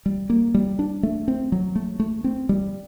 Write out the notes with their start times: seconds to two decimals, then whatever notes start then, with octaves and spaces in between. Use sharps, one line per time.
0.06 G3
0.30 A#3
0.54 G3
0.79 D4
1.03 A3
1.28 C4
1.52 F#3
1.76 A3
2.00 A3
2.24 C4
2.49 G3